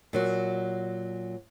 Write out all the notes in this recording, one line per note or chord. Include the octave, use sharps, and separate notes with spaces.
A#2 F#3 F#4